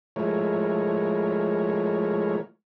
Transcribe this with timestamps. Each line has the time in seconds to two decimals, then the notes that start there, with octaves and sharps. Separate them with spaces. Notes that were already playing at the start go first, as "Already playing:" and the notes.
0.16 F3 G#3 A3 E4 A#4 C#5